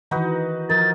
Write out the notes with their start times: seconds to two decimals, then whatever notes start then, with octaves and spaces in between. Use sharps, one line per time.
0.11 D#3 E3 D#4 F#4 B4
0.70 F3 D#4 A#4 A6